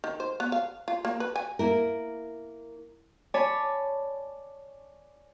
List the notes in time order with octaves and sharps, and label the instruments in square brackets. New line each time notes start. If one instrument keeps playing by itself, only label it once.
[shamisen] D#3
C5
B3
F5
F4
A#3
B4
G#5
[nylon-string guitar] A#3 E4 A#4
[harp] C#5 D5 G#5 A5 B5 D6